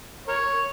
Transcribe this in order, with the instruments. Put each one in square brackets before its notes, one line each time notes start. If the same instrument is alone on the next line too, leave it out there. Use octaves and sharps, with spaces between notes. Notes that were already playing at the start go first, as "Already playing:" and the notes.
[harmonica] A#4 C#5